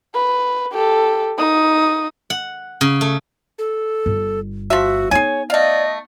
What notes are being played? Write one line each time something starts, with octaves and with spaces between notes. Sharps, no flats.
B4
G4 A4
D#4 D#6
F#5
C#3
A3
A4
G1
F3 F#4 E5
B3 D#4 G#4 C#5 G#5
A3 D5 D#5 F5